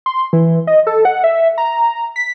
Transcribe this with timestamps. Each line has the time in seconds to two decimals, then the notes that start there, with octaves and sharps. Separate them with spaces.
0.06 C6
0.33 E3
0.67 D#5
0.87 A4
1.05 F#5
1.24 E5
1.58 A#5
2.16 B6